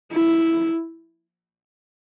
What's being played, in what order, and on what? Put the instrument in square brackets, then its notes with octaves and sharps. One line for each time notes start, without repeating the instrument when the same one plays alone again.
[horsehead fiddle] E4